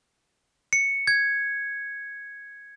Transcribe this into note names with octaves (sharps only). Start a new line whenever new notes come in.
C#7
G#6